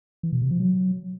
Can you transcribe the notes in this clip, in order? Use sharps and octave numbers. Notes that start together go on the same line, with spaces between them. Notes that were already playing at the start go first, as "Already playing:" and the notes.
E3
B2
C3
F3
F#3